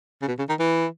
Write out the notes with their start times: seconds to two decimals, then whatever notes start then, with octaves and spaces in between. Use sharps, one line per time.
0.22 C#3
0.28 B2
0.38 C#3
0.49 D#3
0.59 E3